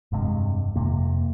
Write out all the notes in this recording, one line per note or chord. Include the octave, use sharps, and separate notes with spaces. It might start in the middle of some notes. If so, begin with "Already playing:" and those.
F1 G2 C3 G#3
F2 C3 A#3